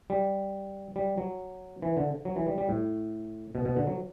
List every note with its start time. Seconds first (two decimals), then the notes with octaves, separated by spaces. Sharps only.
0.10 G3
0.96 G3
1.18 F#3
1.82 E3
1.97 D3
2.25 F#3
2.36 E3
2.47 G3
2.58 G3
2.69 A2
3.55 B2
3.65 B2
3.76 D3
3.87 F#3